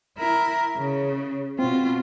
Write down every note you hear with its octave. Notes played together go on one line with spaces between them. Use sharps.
E4 A#4
C#3
B2 C4 F4